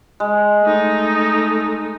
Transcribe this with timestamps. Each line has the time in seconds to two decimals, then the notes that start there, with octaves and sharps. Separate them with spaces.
0.20 G#3
0.62 A3 D#4